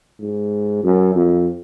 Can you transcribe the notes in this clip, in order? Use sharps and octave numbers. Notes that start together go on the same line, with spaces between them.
G#2
F#2
F2